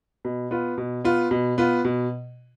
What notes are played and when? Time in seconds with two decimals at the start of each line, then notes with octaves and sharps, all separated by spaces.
0.25 B2
0.51 B3 F4
0.78 B2
1.04 B3 F4
1.31 B2
1.58 B3 F4
1.85 B2